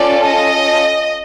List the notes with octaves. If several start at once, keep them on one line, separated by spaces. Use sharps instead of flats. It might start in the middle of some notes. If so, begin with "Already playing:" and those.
Already playing: C#4 F4 A4 D5
D#5